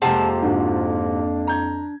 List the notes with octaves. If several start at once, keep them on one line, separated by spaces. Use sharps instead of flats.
F2 C3 F3 G#3 A#3 F#5 A5
G#2 D3 D4 F#4
A#5 G6 G#6